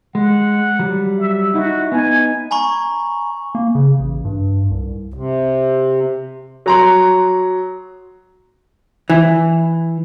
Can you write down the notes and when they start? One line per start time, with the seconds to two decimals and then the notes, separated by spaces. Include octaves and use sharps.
0.15 G#3 F#5
0.79 F#3 G3
1.19 E5
1.54 D#4 E4 F#4
1.92 B3 D#4 G#5
2.51 G#5 A#5 B5 C#6
3.55 A#3
3.75 C#3
4.00 A1
4.25 G2
4.70 C2
5.14 C3
6.66 F#3 A#5 C6
9.10 E3